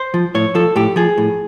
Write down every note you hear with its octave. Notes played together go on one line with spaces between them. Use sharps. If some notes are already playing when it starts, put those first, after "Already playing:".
Already playing: C5
F3
A2 C#5
F3 A4
A2 G4
F3 G#4
A2